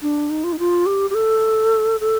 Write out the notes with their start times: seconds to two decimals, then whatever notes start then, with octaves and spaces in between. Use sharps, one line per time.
0.02 D4
0.30 D#4
0.44 F4
0.53 D#4
0.59 F4
0.86 G4
1.10 G4
1.15 A4
2.00 A4